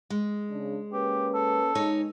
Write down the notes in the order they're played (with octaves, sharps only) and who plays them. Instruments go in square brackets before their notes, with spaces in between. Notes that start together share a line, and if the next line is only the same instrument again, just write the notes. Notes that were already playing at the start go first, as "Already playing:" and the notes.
[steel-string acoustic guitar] G#3
[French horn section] C#3 D4
[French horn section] A#3 C#4 B4 [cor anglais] G4
[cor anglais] A4
[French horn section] G#3 [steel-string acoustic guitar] D#4 C#5